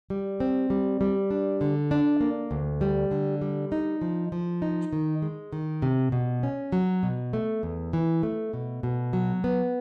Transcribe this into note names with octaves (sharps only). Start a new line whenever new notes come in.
G3
C4
G3
G3
D4
D3
D4
A#3
D2
G3
D3
G3
D#4
F3
F3
D#4
D#3
G#3
D#3
C3
B2
C#4
F#3
B2
A3
E2
E3
A3
B2
B2
F#3
B3